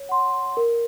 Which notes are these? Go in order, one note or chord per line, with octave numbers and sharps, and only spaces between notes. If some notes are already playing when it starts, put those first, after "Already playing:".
Already playing: C#5
F#5 C6
A#4